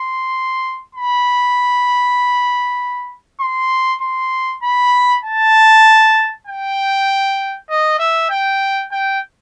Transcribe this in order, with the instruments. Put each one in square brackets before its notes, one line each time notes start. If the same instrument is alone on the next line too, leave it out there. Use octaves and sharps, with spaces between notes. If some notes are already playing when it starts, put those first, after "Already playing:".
Already playing: [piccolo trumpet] C6
B5
C6
C6
B5
A5
G5
D#5
E5
G5
G5